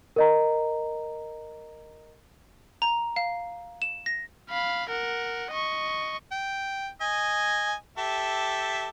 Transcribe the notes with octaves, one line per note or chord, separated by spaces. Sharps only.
A#4 D#5 A#5
A#5
F5
E7
A#6
F5 B5
A#4 F#5
D#5 C#6
G5
D#5 G#5
G4 A4 E5